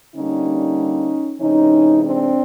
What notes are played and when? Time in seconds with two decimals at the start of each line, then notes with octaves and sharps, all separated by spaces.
0.17 D3 G3 A#3 C#4 D#4
1.41 C3 E3 G#3 C#4 D#4
2.03 C4 D4